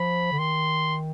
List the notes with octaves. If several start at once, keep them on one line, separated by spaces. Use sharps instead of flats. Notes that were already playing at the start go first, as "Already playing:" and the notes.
Already playing: F3 B5
D3
D#3 C6